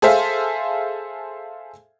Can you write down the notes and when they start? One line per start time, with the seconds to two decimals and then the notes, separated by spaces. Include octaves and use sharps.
0.02 G#4 A4 C5 E5 F5